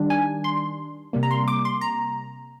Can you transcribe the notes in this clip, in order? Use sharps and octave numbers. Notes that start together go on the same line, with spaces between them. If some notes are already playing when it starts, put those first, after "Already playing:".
Already playing: D#3 G3 D4
G#5
C6
C3 G3 A#3
A#5
C6
D6
C6
A#5